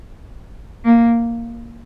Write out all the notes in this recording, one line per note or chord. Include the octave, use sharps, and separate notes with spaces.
A#3